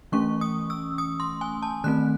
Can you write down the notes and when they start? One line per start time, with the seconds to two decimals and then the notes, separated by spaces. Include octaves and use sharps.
0.12 E3 A3 C#4 C#6
0.41 D#6
0.70 E6
0.98 D#6
1.20 C6
1.41 G#5
1.62 A5
1.84 D#3 A3 C4 F#6